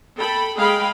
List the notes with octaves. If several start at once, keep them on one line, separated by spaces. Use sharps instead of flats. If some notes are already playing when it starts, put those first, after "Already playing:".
A4 G5 B5
G#3 G#4 F5 G5 B5